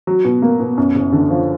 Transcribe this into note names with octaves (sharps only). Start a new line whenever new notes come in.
F#3
B2
A#3
B2
F#2
F#1
D3
F3